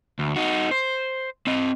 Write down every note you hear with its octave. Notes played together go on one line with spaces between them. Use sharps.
D2
D#4 F#4
C5
C4 D#5